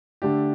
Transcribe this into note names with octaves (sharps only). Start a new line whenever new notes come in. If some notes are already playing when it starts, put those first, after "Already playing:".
D3 A3 D4 G4